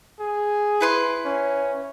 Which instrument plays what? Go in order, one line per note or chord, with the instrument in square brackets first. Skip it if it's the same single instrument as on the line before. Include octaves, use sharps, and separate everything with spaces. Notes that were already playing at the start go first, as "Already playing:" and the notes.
[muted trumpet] G#4
[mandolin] E4 B4 C6
[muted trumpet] C#4